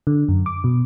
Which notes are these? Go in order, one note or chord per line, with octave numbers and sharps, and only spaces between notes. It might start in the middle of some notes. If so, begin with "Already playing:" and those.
D3
F#2
D6
B2